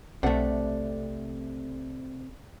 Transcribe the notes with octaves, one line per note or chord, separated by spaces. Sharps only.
B1 C3 A3 D4 F#5